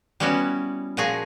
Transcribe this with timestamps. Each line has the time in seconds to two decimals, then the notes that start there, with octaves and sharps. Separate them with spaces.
0.20 G3 B3 C#4 E4 F#4
0.97 A#2 F3 F#4 G#4 G#5 A#5